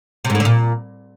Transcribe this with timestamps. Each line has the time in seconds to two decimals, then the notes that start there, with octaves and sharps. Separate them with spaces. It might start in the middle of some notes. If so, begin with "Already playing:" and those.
0.25 C3
0.30 G#2
0.35 A2
0.40 D3
0.45 A#2